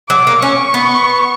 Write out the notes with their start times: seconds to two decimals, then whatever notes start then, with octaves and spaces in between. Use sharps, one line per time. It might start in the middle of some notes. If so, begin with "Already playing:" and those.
0.10 F#3 D6
0.27 A#3
0.42 C#4 C#6
0.74 B3